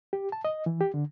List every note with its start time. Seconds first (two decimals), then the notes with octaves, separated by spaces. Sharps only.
0.13 G4
0.32 A5
0.45 D#5
0.66 E3
0.81 G4
0.94 D3